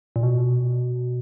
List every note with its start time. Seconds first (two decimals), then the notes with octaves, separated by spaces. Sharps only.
0.16 A#2
0.23 B2